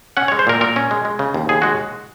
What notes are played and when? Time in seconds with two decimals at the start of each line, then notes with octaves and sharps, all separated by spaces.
0.17 C#4 F#5
0.28 C#5
0.32 G#3
0.39 C5
0.47 A#2 A#4
0.61 A#2 A#4
0.76 C#4
0.91 G#3
1.05 G#3
1.19 C#3
1.34 D#2
1.49 D#2 G#4
1.62 G#3 F#4